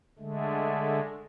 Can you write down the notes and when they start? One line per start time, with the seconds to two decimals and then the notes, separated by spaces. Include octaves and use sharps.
0.19 D3 G#3 A3